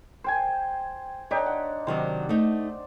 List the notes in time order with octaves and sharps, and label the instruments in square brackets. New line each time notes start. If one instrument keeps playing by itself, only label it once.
[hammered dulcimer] C5 G5 G#5
[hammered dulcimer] D4 D#4 G4 [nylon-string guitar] C#5
[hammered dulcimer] F#5
[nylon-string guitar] C3 D#3 F#3 [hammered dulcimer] C5 D5
[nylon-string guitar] A3 D#4